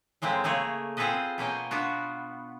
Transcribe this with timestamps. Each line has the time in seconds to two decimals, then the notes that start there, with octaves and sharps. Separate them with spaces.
0.22 A2 G#3 A#3 C4 B4
0.44 C#3 A3 A#3 G#4 C#5
0.97 C4 F4 G#4 A4 B4 D#5
1.38 B2 A#3 C#4 D#5 G5
1.71 B3 D4 F4 F#4